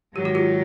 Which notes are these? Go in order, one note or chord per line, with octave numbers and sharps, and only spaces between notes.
G#2 D#3 F#3 G4
F#4
F4 G4